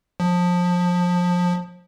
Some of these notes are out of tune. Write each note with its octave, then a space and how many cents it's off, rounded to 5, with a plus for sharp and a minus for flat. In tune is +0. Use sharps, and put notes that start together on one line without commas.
F3 +25